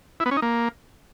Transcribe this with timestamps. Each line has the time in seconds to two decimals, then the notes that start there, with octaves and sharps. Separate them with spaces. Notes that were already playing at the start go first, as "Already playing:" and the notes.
0.20 E4
0.26 B3
0.31 C#4
0.37 D#4
0.42 A#3